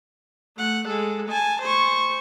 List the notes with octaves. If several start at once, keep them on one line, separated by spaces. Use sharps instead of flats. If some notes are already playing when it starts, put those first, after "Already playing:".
A3 F#5
G#3 A4
G#5 A5
C5 C#6